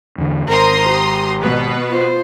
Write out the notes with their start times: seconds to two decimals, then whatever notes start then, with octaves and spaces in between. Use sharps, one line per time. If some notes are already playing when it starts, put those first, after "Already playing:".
0.18 E2 D3
0.48 G#1 A#4 C5 A#5 C6 D#6
0.89 G4
1.41 B2 B3 B4
1.89 F4 C5